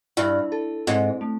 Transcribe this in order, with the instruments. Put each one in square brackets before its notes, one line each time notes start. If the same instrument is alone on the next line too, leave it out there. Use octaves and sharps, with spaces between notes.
[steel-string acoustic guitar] G2 [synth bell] E4
[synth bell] A4
[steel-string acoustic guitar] G#2 [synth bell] C4
[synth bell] A3